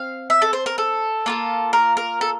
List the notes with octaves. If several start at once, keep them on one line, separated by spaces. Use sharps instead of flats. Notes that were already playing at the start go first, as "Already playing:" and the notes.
Already playing: C4 F5
E5
A4
C5
A#4
A4
A#3 F4 A4
A#4
A#4
A4